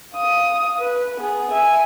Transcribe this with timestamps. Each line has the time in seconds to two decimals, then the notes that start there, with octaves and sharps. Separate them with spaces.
0.14 F5 D#6
0.78 B4
1.20 B3 G#4
1.52 E5 G#5